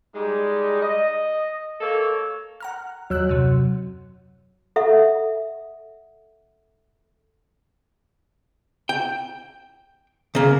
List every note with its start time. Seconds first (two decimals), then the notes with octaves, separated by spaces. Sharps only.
0.15 G3 G#3 D#4
0.81 D#5
1.81 A#3 A4 C#5
2.60 F#5 A#5 F6
3.10 D#2 F#3 E6 F#6
3.29 F#2 C3
4.76 A4 E5 F#5
8.89 G5
10.35 C#3 A#3